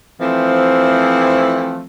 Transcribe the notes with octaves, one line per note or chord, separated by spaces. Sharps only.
E3 F3 A3 C4